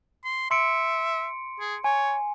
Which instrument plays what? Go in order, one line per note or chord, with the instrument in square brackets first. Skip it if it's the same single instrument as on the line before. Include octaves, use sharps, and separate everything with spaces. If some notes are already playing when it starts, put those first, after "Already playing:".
[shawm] C6
[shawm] E5 [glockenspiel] C6 C#7 D7
[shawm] G#4
[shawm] C#5 [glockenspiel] G#5